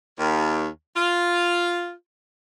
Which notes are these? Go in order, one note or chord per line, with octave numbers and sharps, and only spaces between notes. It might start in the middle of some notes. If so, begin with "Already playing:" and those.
D#2
F4